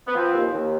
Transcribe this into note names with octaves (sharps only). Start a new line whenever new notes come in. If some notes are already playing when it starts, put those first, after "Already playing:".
B3
F3 C4
D#2
D#2